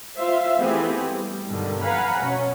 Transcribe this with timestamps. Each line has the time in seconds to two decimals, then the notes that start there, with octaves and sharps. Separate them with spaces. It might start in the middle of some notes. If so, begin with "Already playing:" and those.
0.17 F4 C5 E5 F5
0.57 E3 A3 B3 C4 G4 G#4
1.12 G3
1.49 G2 B2 D3 D#3 G3
1.82 B4 F5 F#5 G#5 A#5 B5
2.20 B2 C#4